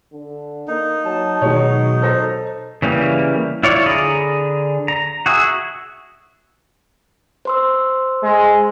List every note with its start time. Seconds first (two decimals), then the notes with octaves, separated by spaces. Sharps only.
0.12 D3
0.68 A#3 D#4
1.05 F#3 A5
1.42 B2 D#3 F#3 G#3 C#5
2.02 A4 C5 A#6
2.82 C#3 E3 G3 A#3
3.63 E4 F4 C#5 D5
3.86 D3 G#4 A#5 B5
4.88 A#5
5.26 F#4 G#4 E5
7.45 C5 C6 E6
8.22 G#3